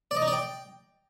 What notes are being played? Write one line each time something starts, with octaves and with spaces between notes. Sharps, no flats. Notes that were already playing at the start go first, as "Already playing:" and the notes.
D5
D#5
D#4
D5
G5